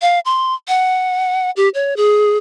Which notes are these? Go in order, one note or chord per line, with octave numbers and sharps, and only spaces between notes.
F5
C6
F#5
G4
C#5
G#4